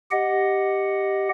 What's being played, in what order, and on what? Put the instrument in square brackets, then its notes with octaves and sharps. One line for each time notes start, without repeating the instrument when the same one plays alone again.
[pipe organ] G4 D#5 F#5